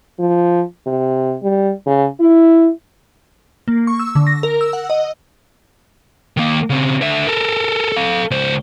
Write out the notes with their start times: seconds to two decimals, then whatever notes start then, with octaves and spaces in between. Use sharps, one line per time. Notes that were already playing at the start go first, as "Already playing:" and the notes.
0.19 F3
0.86 C3
1.43 G3
1.87 C#3
2.20 E4
3.68 A#3
3.87 C#6
3.99 E6
4.15 D3
4.27 A#6
4.43 A#4
4.61 E6
4.73 F#5
4.90 D#5
6.37 D#3 A#3
6.70 C#3 C4
7.02 D3 E5
7.27 A4 A#4
7.92 A4 F5
8.31 C#2 C5